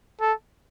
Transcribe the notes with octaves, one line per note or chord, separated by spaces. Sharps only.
A4